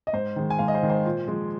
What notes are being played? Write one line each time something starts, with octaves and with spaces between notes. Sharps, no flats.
D#5
G#2 C5
D#3 G#3
G#5
G#2 F5
D#5
C5
D#3 G#3
C5
A#2
F3 G#3